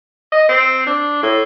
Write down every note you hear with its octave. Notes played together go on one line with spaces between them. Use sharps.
D#5
C4
D4
A2